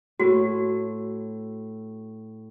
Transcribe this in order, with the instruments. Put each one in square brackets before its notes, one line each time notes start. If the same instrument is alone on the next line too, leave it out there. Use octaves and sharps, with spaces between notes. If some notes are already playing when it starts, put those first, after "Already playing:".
[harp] A2 [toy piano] F#4